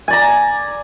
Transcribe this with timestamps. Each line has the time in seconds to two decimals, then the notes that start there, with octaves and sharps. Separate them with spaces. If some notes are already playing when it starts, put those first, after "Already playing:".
0.08 G#5
0.10 D5
0.13 A#5